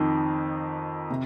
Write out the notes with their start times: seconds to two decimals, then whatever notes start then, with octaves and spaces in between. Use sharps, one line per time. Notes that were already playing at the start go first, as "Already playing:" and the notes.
Already playing: F2 D#3 D#4
1.10 C3